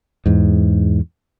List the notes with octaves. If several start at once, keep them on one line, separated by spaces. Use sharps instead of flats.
E2 G#2